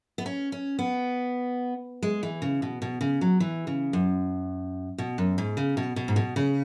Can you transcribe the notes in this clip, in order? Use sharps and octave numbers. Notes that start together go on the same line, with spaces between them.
B3
C#4
C#4
B3
G#3
E3
C#3
B2
B2
C#3
F#3
E3
C#3
F#2
B2
F#2
G#2
C#3
B2
B2
G#2
B2
C#3